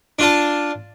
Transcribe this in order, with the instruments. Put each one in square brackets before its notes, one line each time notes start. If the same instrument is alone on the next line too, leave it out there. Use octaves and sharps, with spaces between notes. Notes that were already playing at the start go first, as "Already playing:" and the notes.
[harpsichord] D4 F4 A5